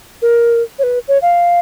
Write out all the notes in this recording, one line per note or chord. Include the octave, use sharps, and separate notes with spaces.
A#4
C#5
B4
C#5
F5